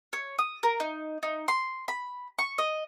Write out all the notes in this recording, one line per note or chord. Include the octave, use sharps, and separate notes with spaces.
C#5
D#6
A#4
D#4
D#4
C6
B5
C#6
D#5